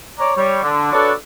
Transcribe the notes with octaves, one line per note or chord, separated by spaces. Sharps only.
C#5 D5 A#5
G3 C#5
D3
D4 F#4 A4 B4 C#5 D5